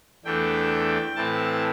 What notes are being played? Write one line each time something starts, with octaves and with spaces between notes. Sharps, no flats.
E2 E3 A3 D4 G5
A2 E3 C4 A5